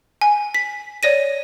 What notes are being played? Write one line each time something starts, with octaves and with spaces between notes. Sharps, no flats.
G#5
B6
C#5 D5 A#6 D#7